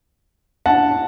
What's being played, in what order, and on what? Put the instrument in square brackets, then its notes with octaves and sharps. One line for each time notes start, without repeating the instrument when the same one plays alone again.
[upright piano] F#5 A5